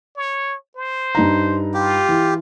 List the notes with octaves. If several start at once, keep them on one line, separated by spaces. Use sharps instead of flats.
C#5
C5
G2 D#4 A#5
F4 G4
E3